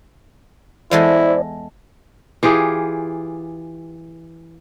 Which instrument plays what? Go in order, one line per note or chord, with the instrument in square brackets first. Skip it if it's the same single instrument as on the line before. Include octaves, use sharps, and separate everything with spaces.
[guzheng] E2 G#3 A4 [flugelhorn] E4 [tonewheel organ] C5 D5
[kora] E3 F4 G4 G#4